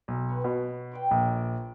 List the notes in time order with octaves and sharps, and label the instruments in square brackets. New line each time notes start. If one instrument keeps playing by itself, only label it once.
[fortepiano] B1
[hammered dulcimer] B4 C#5
[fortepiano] B2
[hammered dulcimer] C5 D5 G5
[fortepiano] A#1